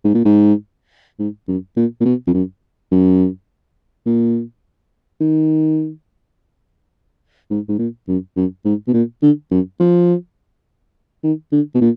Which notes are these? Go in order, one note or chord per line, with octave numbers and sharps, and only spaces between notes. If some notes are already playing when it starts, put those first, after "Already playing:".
G#2
A#2
G#2
G#2
F#2
A#2
A#2
B2
F2
F#2
F#2
A#2
D#3
G#2
G#2
A#2
F#2
F#2
G#2
B2
A#2
D3
F#2
F3
D#3
D3
B2
A#2